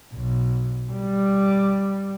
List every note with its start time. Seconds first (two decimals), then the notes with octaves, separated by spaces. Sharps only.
0.13 B1
0.92 G3